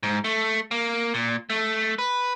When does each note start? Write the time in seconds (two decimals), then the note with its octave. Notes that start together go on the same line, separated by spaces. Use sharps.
0.03 G#2
0.24 A3
0.71 A#3
1.14 A#2
1.50 A3
1.99 B4